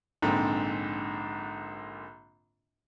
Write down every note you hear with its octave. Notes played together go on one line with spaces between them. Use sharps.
A#1 G#2 D3 C4